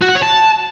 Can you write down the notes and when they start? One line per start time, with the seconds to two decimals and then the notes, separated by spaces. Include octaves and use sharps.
0.02 F#4
0.09 F#5
0.16 C#5
0.23 A5